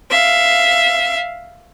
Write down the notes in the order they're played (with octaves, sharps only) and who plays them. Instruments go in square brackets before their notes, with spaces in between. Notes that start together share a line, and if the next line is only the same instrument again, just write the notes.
[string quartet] E5 F5